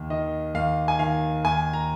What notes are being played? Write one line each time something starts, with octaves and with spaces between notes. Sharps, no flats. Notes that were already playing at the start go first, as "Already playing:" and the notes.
Already playing: D#2
D#3 D#5
D#2 F5
G#5
D#3 F5
D#2 G#5
A#5